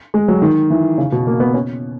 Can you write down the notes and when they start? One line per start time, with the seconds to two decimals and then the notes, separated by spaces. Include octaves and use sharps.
0.14 G#3
0.28 F#3
0.42 D#3
0.70 E3
0.98 C#3
1.12 B2
1.27 A#3
1.40 B3
1.54 C#4